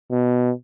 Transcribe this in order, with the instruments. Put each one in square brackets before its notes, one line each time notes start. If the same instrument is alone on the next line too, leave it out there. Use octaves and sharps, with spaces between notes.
[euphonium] B2